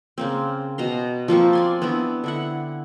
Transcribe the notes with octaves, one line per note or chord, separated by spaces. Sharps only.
C#3 A#3 C4
B2 A#5 C6
F3 A#3 C4 C#6
D5 G#5 C6
B3 C4 D4 E4
D3 E4 F#5